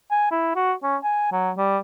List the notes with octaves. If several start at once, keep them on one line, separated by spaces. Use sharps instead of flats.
G#5
E4
F#4
C#4
G#5
F#3
G3